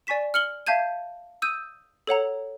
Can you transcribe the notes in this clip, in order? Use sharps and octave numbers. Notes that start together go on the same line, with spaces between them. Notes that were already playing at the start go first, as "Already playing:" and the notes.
D5 G#5 C#6 B6 E7
F6 C#7 F#7 G7
E5 F5 A5 G6 G#6 D#7
D#6 E6 G6 D#7
A4 C#5 F#5 A#5